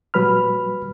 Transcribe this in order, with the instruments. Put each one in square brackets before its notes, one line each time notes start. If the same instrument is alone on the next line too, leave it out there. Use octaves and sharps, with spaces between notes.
[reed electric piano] A#2 F#3 G3 B4 B5 F6